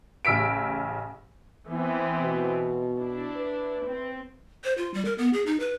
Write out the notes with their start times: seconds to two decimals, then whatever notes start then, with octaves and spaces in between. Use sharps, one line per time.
0.25 A1 C#3 E6 B6 D7
1.69 E3 B3 C4
2.22 B2
2.99 D4 E4
3.36 B4
3.87 C4
4.64 C5
4.78 F4
4.94 G3
5.05 A#4
5.18 B3
5.33 G#4
5.46 D#4
5.60 B4